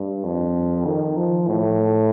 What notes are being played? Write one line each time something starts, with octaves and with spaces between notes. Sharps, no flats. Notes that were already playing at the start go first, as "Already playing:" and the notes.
Already playing: G2
F2
D#3
F3
A2